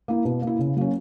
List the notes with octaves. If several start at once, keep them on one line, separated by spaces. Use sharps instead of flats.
A#3 E4
B2
A#3
E4
C#3
F#3 A#3 C#4